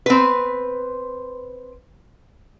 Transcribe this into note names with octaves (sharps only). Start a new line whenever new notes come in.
C4 B4